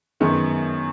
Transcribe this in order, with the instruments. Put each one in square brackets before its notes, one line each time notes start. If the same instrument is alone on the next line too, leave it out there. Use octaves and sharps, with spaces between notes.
[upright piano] F#2 D#3 G#3 B3